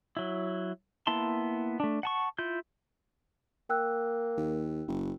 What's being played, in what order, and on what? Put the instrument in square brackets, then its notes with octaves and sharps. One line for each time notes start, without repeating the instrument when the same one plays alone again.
[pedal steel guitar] F#3 E4
A#3 B3 E4 A5 C6
A3 D4
F#5 A5 C#6
E4 F4 G6
[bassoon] A#3 [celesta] G5 E6 F#6
[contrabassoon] D#2
F#1